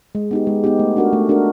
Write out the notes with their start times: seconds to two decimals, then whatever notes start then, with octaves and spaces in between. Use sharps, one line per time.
0.15 G#3
0.31 B3 D#4 G4
0.47 G#3
0.64 B3 D#4 G4
0.79 A3
0.96 D4 F#4 A#4
1.13 A3
1.29 D4 F#4 A#4